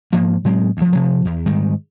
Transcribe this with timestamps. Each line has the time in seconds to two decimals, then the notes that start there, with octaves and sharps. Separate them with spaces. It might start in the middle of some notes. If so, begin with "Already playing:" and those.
0.13 G#2 F3 A#3
0.45 A2 F#3 G#3 C4
0.77 D2 F3
0.92 C3 F3
1.25 E2
1.46 G#2 D#3 G3